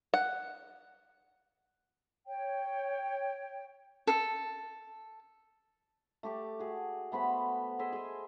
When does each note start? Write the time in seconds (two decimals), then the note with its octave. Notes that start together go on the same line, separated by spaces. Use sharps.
0.14 F#5
2.26 C#5 G5
4.07 A4
6.23 A3 G4 D6
6.59 F#4 G#4
7.12 A3 B3 C5 B5
7.79 G#4 D#5 E5 C6
7.93 G#4 G#5